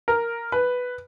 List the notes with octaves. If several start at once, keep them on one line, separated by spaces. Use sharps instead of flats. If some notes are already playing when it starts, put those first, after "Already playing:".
A#4
B4